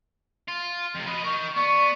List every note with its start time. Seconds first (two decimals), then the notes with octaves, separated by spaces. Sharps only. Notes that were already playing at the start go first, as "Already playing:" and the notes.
0.48 F4
0.95 F2 C3
1.07 B4 D#5
1.24 D#4 A#4 C#6
1.57 B3 D5 C#6